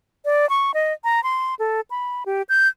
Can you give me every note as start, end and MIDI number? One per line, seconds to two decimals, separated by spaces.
0.25 0.48 74
0.49 0.72 85
0.74 0.93 75
1.04 1.23 82
1.24 1.55 84
1.59 1.81 69
1.91 2.24 83
2.26 2.42 67
2.49 2.68 91